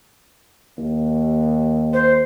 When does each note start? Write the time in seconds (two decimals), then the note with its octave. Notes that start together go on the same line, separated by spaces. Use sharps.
0.78 D#2
1.93 C5